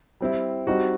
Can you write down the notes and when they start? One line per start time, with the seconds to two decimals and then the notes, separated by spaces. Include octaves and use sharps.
0.21 G3 C4 E4
0.67 G3 C4 D#4 F#4